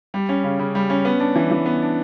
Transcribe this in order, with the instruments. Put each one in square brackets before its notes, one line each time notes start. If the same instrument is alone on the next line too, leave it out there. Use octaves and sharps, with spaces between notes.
[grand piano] G3
C#4
C#3
C#3
G3
C#4
B3
D4
E3
E3
B3
D4